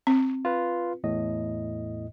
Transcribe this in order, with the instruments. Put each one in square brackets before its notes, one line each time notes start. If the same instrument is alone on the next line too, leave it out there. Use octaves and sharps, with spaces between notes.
[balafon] C4
[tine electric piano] F4 B4
E2 A2 D#5